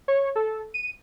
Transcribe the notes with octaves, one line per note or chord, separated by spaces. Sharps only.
C#5
A4
D#7